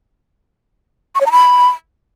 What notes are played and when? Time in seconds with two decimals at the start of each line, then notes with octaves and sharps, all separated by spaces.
1.15 C#6
1.21 C#5
1.26 A#5
1.32 B5